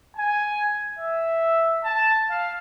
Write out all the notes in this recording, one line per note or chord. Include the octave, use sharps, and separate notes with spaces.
G#5
E5
A5
F5